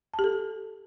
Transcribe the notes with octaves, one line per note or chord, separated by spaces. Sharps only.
A5
G4
A4